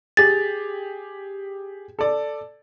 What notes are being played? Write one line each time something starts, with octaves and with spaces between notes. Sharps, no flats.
G4 G#4 A6
A4 D5